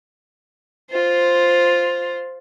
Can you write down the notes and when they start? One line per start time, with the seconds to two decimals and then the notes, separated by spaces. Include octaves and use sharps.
0.90 F4 C5